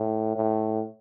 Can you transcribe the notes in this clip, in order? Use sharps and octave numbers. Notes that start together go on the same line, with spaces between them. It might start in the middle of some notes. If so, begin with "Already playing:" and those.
Already playing: A2
A2